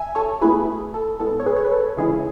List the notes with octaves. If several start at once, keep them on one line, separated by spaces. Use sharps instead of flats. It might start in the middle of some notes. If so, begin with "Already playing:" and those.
Already playing: E5 G#5
A4 C#5
B2 A3 E4 G#4 B4
A4
A2 G#3 B3 A4
C#5
G#4 B4
C#5
B4
A4
C#3 E3 G#3 C#4 E4 G#4